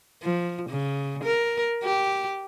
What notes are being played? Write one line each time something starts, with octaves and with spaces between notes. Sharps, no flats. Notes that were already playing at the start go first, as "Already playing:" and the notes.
F3
C#3
A#4
G4